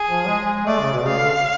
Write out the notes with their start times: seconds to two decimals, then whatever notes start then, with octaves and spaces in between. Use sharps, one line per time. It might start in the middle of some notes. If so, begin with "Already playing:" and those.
Already playing: G#4
0.08 F3
0.28 G#3
0.66 A3 D5
0.80 C#3
0.93 B2
1.05 C#3 F5
1.19 D3